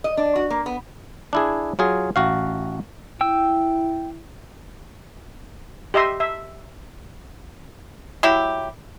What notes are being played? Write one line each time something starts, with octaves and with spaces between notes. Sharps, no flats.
D#5
D4
F#4
A#3
B3
D4 E4 G#4
F#3 F4 G#4
A1 F#4 F5
E4 G5 E6
G4 D#5 E5 C6
E5
F#3 E4 G4